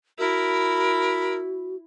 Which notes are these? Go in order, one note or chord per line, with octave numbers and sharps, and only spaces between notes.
E4 F#4 A#4 B5